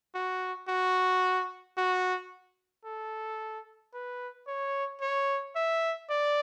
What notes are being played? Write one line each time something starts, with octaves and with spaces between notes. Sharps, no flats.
F#4
F#4
F#4
A4
B4
C#5
C#5
E5
D5